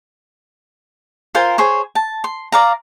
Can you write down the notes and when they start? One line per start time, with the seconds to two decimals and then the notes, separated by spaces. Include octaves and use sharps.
1.35 F4 A#4 C5 G#5
1.58 G#4 C5 C#5
1.95 A5
2.24 C6
2.52 D5 F5 A#5